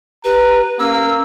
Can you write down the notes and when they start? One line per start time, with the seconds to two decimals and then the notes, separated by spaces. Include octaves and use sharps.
0.24 G4 B4 A#5
0.79 A#3 C#4 E6